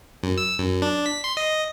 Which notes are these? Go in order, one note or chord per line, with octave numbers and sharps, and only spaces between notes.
F#2
E6
F#2
D4
B6
C6
D#5